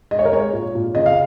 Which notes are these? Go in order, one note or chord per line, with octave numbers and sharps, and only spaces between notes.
G#3 D#5
C#5
A#4
G#3 C#5
A#2
A#2
C#3 D#5
F5